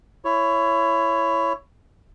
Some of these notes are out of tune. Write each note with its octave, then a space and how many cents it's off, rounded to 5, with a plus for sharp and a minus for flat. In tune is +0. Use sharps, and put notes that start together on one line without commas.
E4 +20 C#5 +0